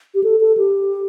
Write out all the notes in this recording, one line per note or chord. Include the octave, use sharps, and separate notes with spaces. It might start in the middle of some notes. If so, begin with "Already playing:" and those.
G4
A4
A4
G4